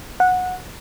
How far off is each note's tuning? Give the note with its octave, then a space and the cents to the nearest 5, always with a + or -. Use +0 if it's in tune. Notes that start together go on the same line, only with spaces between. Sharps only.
F#5 -15